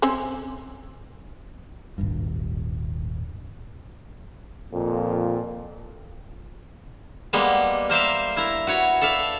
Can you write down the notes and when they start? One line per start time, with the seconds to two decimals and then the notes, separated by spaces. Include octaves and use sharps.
0.02 C4 C#4 C5
1.98 D#1 G#1 G2
4.73 F2 A#2
7.33 G3 G#3 A#3 B3
7.90 A#4 C5 E5 F5
8.37 E4 A#4
8.67 F#4 B4 C#5
9.01 A4 D5 E5 F5